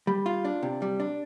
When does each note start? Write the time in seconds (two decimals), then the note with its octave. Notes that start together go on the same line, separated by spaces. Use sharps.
0.07 G3
0.26 F4
0.45 D4
0.63 C3
0.82 G3
1.00 D4